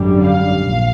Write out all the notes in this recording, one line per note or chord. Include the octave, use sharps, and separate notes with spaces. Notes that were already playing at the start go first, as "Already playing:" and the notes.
Already playing: G#1 F#2 D3 G3
F5
A#1